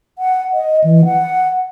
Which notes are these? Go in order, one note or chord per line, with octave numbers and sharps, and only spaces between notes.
F#5
D#5
E3
F#5